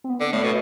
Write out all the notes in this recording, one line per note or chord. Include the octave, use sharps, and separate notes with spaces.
C4
B3
D3
A2 A3
B2